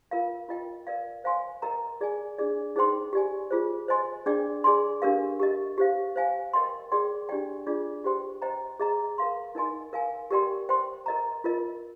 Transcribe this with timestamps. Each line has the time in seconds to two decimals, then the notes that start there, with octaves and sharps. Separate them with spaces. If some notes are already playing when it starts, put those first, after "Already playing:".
0.11 F4 A#4 F5
0.49 F4 A#4 D#5 G5
0.87 A#4 D5 F5
1.24 C5 F5 G#5 C6
1.62 A#4 D#5 G5 A#5
2.01 G#4 D5 G#5
2.38 D4 G#4 D5
2.76 D#4 G#4 C5 G5 C6
3.13 G4 D5 G#5
3.51 F4 G#4 C5
3.88 C5 D#5 G#5 C6
4.26 D4 G#4 D5 G5
4.64 G#4 D5 G#5 C6
5.02 D4 G4 A#4 F5
5.40 G4 A#4 D#5
5.78 G4 C5 F5
6.16 C5 F5 G#5
6.53 A#4 D#5 G5 C6
6.92 G#4 D5 G5 C6
7.29 D4 G4 D5 G5
7.67 D4 F4 G#4 D5
8.04 G4 C5 G5 C6
8.42 C5 D#5 G5 A#5
8.80 G#4 D#5 A#5
9.18 A#4 F5 C6
9.55 D#4 A#4 D#5 G#5 C6
9.93 A#4 F5 G#5
10.31 G4 A#4 D5 G5 C6
10.69 C5 G5 C6
11.06 A#4 D#5 A#5
11.44 F4 A#4 D#5